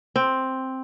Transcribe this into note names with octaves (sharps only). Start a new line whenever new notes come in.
C4